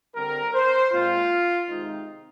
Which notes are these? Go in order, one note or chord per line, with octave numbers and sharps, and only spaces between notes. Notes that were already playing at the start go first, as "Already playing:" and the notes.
D3 G3 C4 A#4
C5
A#2 G#3 C4 F4
C3 D#3 G#3 C4 D#4